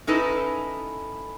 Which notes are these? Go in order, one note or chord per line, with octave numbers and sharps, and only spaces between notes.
C#4 D#4 E4 A4 B4